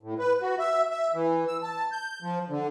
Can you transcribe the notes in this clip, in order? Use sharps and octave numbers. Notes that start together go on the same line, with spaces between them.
A2
B4
F#4
E5
E5
E3
E6
A5
G6
F3
D3